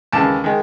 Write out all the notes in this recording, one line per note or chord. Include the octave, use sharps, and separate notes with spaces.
D#2 C#3 E3 G#3 A5
D#3 G#3